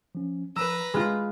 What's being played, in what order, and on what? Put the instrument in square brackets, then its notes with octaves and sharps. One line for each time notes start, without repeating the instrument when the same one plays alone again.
[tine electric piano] F3 C#4
[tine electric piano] F3 [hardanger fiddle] B4 A#5 [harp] E6
[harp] G#3 F4 [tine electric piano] B5 F6 F#6